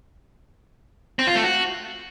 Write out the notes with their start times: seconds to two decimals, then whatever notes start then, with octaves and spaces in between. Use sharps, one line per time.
1.19 C4
1.27 F4
1.35 A3
1.44 F#4